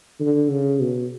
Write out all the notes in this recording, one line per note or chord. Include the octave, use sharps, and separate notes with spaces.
D3
C#3
B2